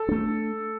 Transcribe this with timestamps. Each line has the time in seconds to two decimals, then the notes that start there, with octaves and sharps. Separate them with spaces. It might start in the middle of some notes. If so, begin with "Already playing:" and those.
Already playing: A4
0.09 A3 D4